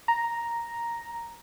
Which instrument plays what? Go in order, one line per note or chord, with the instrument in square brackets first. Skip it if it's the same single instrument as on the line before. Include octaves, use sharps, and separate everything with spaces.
[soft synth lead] A#5